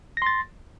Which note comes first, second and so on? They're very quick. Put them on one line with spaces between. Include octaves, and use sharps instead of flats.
A#6 C6 A6